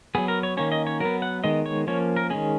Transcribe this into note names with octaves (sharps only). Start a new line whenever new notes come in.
F#3 B3 G#4
A#4
C#5
D#3 A#3 C#4 C#5
D#5
C#5
F#3 B3 A#4
F#5
D#3 G#3 B3 D#5
C#5
F3 A#3 C#4 C#5
A#4
D#3 G#3 C#4 G#4